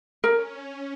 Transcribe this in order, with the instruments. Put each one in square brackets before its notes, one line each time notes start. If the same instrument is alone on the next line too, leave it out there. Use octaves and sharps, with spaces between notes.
[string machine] C#4 [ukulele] A#4